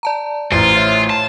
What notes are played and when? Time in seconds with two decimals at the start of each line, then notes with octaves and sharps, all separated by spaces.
0.03 D5 A5 A#5
0.52 A1 F4 C5 A#5 A6
0.76 C#5 E5 A6
1.10 A5